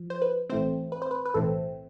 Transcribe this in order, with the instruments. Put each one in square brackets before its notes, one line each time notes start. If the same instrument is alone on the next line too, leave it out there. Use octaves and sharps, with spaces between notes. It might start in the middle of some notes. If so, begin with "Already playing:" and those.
Already playing: [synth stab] F3
C5
B4
B1 A2 E3 A3 C4 C5
B4
C5
B4
B4
B1 A2 E3 A3 C4 A4